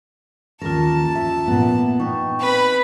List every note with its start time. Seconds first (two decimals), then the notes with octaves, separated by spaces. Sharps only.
0.62 D#2 C#4 F4 A#4 A5
1.15 E5
1.48 A#2 B3
2.00 D#4 G5 C#6
2.39 C4 B4 B5